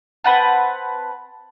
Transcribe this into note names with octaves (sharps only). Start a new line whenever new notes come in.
C4 B4 F#5 A5